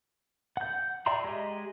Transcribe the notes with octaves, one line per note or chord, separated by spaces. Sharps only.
F#5 G6
D5 E5 G5 A#5 C6
G#3 G4 D#5